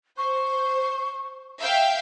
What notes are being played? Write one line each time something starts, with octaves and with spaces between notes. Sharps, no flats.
C5 C#6
E5 F5 G5